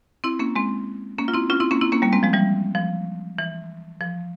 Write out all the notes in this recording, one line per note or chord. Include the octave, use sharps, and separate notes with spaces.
C4 E4
A#3 C#4
G#3 C4
A#3 C#4
F4
C4 E4
C#4 F4
C4 E4
A#3 C#4
C4 E4
A#3 C#4
G3 A#3
G#3 C4
F3 G#3
E3 G3
F3
E3
F3